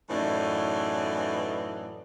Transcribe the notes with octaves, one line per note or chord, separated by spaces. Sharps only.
F#2 A2 E3 D#4 D5